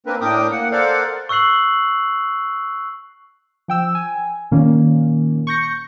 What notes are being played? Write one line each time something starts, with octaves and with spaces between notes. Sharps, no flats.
A#3 C4 D4 A#4 B4
A2 D4 A#4 G5 D6 D#6
A#3 F#5
A4 A#4 C5 D5 F5 F#5
C#6 E6 F#6 C7 F#7
F3 G5 E6
G#5
A#2 D#3 A#3 C#4
C#6 G6 A#6 C#7